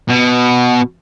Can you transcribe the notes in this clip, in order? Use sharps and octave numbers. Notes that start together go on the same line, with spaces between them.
B2